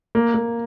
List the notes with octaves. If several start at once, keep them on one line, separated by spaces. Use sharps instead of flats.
A#3
A#3